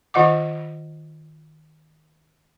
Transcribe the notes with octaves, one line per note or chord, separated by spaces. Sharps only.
D#3 F4 D#5 F#5 D6